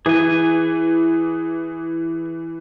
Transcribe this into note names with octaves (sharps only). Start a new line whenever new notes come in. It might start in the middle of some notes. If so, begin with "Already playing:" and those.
E3 G#4 G#5